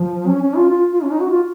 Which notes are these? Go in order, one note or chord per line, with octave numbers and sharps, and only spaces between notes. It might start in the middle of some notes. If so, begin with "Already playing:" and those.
Already playing: F3
C#4
C#4
F4
F4
F4
C#4
D#4
F#4
F4